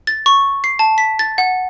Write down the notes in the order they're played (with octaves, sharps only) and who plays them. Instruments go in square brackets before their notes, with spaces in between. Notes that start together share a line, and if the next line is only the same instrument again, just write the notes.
[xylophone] A6
C#6
C7
A5
B6
A6
F#5